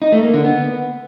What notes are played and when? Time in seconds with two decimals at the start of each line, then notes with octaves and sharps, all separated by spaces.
0.02 D#4
0.12 A3
0.23 A#3
0.34 D3
0.44 B3